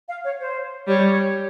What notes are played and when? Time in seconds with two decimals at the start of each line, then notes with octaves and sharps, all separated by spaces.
0.09 F5
0.24 C#5
0.40 C5
0.87 G3 C#5